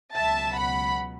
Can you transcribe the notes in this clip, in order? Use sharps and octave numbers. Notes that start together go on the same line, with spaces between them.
C#2 B2 F#3 E5 A5
F#5 B5